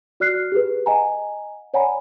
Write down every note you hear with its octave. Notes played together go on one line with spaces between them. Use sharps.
F#4 D5 F6 F#6 C7
G4 G#4 B4
D#5 F#5 G#5 A#5
C#5 D5 F#5 G#5 A#5 B5